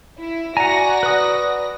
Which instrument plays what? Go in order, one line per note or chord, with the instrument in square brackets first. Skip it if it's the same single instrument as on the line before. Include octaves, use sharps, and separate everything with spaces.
[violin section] E4
[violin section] F#4 D5 A#6 [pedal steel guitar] F#5 G#5 [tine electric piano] A#5
[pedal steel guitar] B4 D#6